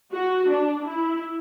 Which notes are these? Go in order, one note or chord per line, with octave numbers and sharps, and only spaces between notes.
F#4
D4
E4